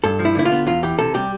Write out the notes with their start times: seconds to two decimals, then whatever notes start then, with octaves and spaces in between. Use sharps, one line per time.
0.04 G2 A4
0.19 F3
0.25 E4
0.35 D3 E4
0.45 F4
0.52 B3
0.67 E2 F4
0.83 E3 G4
0.99 C3 A4
1.14 G3 G4